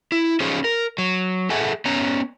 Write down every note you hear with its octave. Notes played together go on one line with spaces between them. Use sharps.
E4
C#4 D#4 F4 G#4 C5
A#4
F#3
G#4 A4 E5 F#5 G#5
B3 C#4 A#5